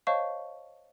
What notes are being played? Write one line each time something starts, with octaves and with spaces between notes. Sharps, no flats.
C5 C#5 D#5 F5 A5 C#6